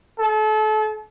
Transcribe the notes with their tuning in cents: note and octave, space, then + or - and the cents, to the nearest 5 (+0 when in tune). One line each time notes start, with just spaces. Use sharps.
A4 -35